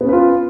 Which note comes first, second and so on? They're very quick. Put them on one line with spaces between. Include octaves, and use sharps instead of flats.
B3 C#4 B4 F4